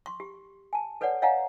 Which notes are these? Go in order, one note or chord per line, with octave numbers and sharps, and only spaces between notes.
C6 C#6
G4
G#5 A5
A4 B4 C#5 D5 F#5
C#5 D#5 F5 F#5 G#5 A#5